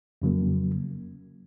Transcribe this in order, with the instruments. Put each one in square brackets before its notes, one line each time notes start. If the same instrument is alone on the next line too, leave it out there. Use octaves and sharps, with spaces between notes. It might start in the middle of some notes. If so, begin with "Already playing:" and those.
[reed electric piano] F2 C#3 F#3 A#3